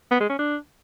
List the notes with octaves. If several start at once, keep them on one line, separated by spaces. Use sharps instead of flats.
B3
G#3
C#4
D4